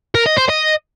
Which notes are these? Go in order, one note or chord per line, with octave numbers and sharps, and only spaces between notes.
A#4
D#5
C5
D#5